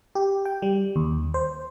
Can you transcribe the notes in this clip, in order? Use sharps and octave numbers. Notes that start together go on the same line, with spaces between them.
G4
G5
G3
D#2
C5